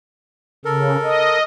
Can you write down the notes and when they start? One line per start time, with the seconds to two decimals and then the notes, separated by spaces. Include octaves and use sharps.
0.65 C#3 A4 A#4
1.03 D#5